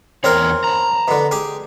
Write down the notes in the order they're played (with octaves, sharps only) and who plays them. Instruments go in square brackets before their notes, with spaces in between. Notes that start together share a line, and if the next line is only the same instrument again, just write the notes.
[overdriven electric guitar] E2 C#5 [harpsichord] C4 A#4
[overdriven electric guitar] A5 A#5
[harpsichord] B2 D3
G4 G#4